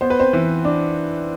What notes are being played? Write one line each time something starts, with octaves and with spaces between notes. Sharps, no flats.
B3 C5
B4
C4 C5
E3
D4